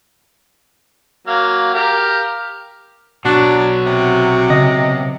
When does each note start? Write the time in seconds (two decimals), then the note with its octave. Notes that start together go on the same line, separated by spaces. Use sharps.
1.27 F#3 A#3 F5
1.74 G4 A#4 F5
3.25 B2 F#3 D4 F#4
3.86 C3
4.50 C#3 D#5 A#6